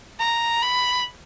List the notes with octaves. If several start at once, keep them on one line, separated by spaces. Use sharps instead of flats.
A#5
B5